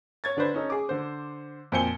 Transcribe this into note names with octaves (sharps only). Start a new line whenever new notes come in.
C#5 G#6 A6
D3 D4 B4 C5
C#4 D#4 A4
G#4 D6
D3 C5
F2 A#2 C5 G#5 C#7 G7